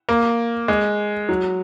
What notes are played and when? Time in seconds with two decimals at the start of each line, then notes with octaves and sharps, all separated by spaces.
0.09 A#3
0.68 G#3
1.29 F#3